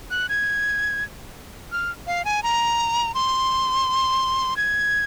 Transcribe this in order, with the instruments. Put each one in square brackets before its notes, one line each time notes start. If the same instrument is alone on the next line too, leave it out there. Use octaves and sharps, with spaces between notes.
[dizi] F#6
G#6
F6
F5
G#5
A#5
C6
G#6